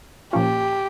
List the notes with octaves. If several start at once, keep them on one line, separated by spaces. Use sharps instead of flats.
A#2 F3 A#3 C#4 F4 G4